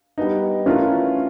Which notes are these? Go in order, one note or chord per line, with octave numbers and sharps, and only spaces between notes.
G3 B3 D#4
E3 A3 C#4 F4 A#4